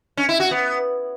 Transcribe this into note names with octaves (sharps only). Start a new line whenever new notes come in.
C#4
E4
F#4
B3